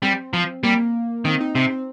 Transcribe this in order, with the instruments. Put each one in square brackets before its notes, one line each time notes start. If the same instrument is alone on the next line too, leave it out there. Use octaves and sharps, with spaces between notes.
[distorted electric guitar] G3 [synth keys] C4
[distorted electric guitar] F3
[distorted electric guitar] G3 [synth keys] A#3
[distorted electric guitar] D#3 [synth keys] C4
[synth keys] D#4
[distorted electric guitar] C3 [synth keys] C4
[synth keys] C4